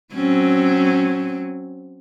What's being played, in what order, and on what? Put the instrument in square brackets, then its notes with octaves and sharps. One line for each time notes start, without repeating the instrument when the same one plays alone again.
[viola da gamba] F#3 C4 C#4